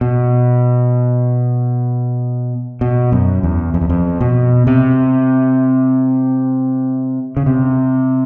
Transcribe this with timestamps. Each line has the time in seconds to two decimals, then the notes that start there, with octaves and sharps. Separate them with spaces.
0.01 B2
2.81 B2
3.12 F#2
3.43 E2
3.74 F2
3.81 E2
3.89 F2
4.21 B2
4.67 C3
7.37 C#3
7.46 C3